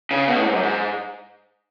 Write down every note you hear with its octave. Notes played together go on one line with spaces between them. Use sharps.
C#3
B2
A2
G#2
F#2
G#2